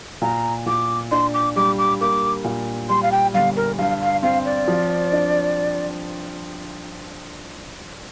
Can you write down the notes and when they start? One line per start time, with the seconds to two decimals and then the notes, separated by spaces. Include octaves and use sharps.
0.22 A#2 A#5
0.66 A#2 D6
1.11 D4 C6
1.34 D6
1.56 G3 D6
1.78 D6
2.01 A#3 D6
2.44 A#2
2.89 G3 C6
3.02 F5
3.12 G5
3.34 G1 F5
3.56 A#4
3.78 G2 F5
4.01 F5
4.23 C4 F5
4.45 D5
4.68 F3
5.12 D4